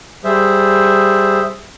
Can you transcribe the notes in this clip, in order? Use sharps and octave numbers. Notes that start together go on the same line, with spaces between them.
G3 G#4 C5 E5